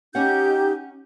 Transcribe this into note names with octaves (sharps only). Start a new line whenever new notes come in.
C#4 D#4 G4 C#5 F#5 G6